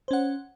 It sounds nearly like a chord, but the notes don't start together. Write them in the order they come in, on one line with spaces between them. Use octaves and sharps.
C5 C#4 F#5